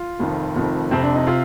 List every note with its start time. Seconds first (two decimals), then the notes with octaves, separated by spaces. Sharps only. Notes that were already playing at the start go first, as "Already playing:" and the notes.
Already playing: F4
0.19 F1 F2 D#3
0.56 F1 F2 D#3
0.90 F1 F2 C3 C4
1.03 D4
1.15 D#4
1.27 C3 F4